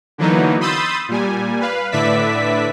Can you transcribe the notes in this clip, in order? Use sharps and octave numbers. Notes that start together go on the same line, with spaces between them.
D3 E3 F#3 A#3 B3 D#4
B5 C6 D#6 E6 G6 A6
A#2 G3 G#5
B4 F5
A2 D3 B4 D5 E5 B6